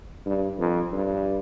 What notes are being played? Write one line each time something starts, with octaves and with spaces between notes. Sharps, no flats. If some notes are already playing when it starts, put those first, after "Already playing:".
G2
F2
G2